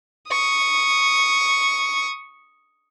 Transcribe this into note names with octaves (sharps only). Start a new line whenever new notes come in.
C#6 D#6